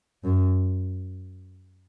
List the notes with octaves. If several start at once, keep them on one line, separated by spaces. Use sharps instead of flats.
F#2